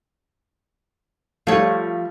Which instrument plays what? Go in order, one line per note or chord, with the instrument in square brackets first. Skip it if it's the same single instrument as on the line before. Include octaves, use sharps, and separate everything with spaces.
[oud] F3 C#5 [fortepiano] G3 A3